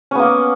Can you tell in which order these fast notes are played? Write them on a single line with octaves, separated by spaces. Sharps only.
C#4 B3 A#3